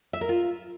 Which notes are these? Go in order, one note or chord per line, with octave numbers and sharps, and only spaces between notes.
E5
A#4
F4